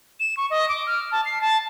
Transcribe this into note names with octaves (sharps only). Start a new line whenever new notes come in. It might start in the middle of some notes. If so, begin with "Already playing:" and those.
E7
C#6
D#5
D6
F6
A5
C7
A5